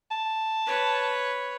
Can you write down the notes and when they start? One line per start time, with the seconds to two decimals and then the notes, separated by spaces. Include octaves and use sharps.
0.11 A5
0.66 B4 C#5